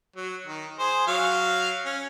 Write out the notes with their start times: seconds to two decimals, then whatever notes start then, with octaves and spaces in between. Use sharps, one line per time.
0.16 F#3
0.47 D#3
0.79 G#4 C5
1.07 F#3 F5
1.85 C#4